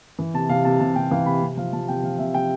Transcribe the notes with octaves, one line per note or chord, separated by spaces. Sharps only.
E3
C3 A5
C3 F5
C3 A5
C3 A5
C3 G5
E3 F5
C3 B5
C3
F3 F5
F3 A5
C3 G5
F3 F5
C3 E5
C3 G5